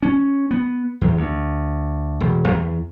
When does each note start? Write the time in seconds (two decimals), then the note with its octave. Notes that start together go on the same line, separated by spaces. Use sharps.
0.03 C#4
0.51 B3
1.01 E2
1.17 D2
2.20 E1
2.48 E2